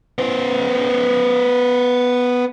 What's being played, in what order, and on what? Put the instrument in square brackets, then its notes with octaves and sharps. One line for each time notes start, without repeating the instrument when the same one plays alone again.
[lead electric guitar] B3 C5